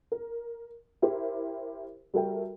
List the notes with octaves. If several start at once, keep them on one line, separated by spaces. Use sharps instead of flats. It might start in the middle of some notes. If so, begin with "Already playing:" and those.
A#4
E4 G4 A#4 C5
G3 F#4 A4 A#4 E5 G5